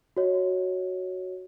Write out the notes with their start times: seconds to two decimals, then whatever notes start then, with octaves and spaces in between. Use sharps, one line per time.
0.17 F#4 C#5 D#5